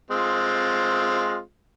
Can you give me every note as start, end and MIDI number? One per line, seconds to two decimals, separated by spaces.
0.11 1.40 56
0.11 1.40 60
0.11 1.40 65